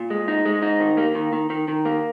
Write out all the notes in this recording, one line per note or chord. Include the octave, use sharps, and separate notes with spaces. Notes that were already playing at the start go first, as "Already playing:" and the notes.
Already playing: A#2
G#3
D#4
G#3
D#4
D#3
A#3
D#3
D#3
D#3
D#3
A#3